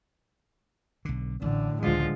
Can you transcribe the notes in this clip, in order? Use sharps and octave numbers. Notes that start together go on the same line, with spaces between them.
B1 D3
A1 A2 D3
C#2 D3 E3 F3 G#3 F4